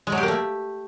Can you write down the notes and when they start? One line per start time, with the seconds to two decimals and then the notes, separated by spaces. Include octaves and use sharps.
0.07 G#3
0.12 F#3
0.17 G4
0.23 A#3
0.28 A3